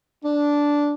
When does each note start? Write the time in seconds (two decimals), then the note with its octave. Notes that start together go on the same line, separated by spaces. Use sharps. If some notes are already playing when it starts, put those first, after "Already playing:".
0.24 D4